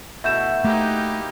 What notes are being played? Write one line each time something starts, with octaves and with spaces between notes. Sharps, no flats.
B2 A3 E4 E5 G6 E7
A3 A#3 D#4 G4 B4